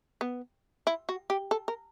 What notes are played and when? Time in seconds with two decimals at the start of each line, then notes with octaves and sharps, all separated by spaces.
0.21 B3
0.87 E4
1.09 F#4
1.30 G4
1.51 A4
1.68 A#4